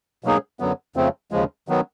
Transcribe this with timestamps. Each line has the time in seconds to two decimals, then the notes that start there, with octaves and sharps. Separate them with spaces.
0.24 B2 F#3 A#3 D#4 G#4
0.60 F#2 D3 F#3 B3
0.96 F2 C#3 F3 A3 C4
1.31 D#2 C#3 F3 G#3
1.68 D#3 F#3 B3